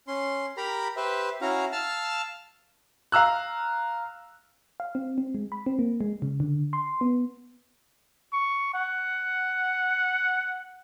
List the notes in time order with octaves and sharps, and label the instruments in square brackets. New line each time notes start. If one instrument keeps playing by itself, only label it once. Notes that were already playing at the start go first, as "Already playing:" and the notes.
[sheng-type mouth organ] C#4 C6
G4 A#4 A#5 B5
G4 B4 C5 E5
C#4 E4 F#4 F5 A#5
F5 A5 E6 F6
[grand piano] F5 A#5 E6 F#6
[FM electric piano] F5
C4
C4
G#3
B5
C4
A#3
G#3
C#3
D3
C6
B3
[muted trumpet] C#6
F#5